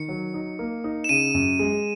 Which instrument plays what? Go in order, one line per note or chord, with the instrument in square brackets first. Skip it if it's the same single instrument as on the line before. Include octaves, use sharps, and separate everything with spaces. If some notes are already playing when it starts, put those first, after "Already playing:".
Already playing: [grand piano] D#3 [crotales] C#7
[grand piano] F#3
D#4
A#3
D#4
[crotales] E7
[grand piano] C#3 [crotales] D#7
[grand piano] F#2
G#3